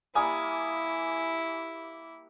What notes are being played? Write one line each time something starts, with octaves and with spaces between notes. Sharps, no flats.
G3 A#3 E4 G#5 D#6